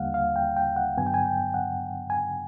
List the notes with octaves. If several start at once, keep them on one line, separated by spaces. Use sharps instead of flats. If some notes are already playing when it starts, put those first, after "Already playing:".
Already playing: D#2 D3 G3 A#3 F5 F#5
F5
G5
G5
F#5
G2 D3 F#3 B3 G#5
G5
G#5
G5
F#5
G#5